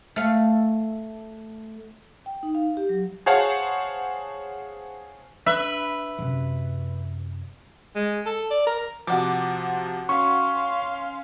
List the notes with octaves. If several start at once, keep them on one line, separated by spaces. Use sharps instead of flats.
A3 F5
G5
D#4
F5
G4
F#3
G#4 C5 C#5 F5 F#5 A5
D4 B4 E5
F#2 C3
G#3
A4
D5
A#4
C3 F3 F#4 D6
C#4 F5 C6 C#6